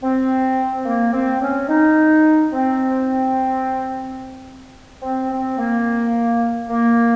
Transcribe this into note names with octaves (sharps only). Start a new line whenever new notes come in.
C4
A#3
C4
C#4
D#4
C4
C4
C4
A#3
A#3